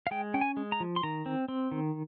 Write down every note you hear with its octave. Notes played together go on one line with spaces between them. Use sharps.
F5
G#3 G5
C#4 G5
G#5
G#3
A#5
F3
C6
D#3 A#5
C4
C4
D#3